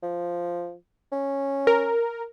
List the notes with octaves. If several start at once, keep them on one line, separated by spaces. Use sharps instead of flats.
F3
C#4
A#4